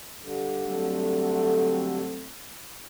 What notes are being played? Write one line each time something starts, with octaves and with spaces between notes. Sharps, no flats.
G2 D3
F#3 A3 C4